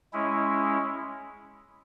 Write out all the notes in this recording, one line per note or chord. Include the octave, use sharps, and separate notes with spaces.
G#3 C#4 E4